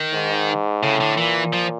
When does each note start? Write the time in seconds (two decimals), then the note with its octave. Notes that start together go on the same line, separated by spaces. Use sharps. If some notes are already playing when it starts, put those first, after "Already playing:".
Already playing: D#3
0.13 G#2
0.83 A2 C#3
1.01 D3
1.18 A#2 E3
1.53 F3